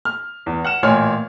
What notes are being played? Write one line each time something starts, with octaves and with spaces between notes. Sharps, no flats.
F6
E2
F#5 F6 E7
A1 A#2 C#5 G#5 F6